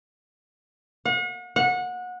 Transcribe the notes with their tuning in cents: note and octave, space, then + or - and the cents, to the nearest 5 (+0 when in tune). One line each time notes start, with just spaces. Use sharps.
F#5 -40
F#5 -25